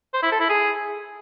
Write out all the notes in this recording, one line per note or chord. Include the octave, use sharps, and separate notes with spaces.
C5
E4
A4
E4
G#4